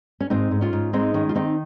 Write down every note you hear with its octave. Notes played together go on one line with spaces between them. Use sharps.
C#4
G#2 C4 D#4
G#2
C#4 F4
G#2
G#3 C4 D#4
D#3 C#4
F4
D#3 C4 D#4